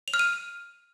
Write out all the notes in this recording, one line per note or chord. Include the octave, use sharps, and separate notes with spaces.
F7
F6
D#7